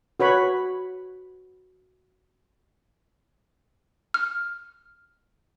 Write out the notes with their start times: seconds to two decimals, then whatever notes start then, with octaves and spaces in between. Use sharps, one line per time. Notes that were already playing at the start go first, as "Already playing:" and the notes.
0.20 F#4 B4 C#5 B5
4.14 F6